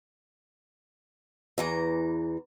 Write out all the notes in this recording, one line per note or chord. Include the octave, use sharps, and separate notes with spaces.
E2 E3 A#5